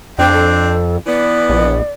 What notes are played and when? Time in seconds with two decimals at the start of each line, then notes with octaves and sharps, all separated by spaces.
0.19 F2 C4 D4 G5
0.33 A4
1.06 E3 B3 D5
1.49 A#1